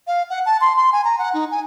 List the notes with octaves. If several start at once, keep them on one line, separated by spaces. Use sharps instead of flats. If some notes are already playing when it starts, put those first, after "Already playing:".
F5
F#5
A5
C6
C6
G#5
A#5
F#5
D#4
G#5